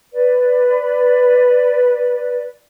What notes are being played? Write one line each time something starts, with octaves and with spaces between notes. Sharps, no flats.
B4 D5